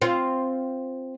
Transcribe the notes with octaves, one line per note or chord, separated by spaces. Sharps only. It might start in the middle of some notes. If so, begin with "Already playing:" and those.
C4 F4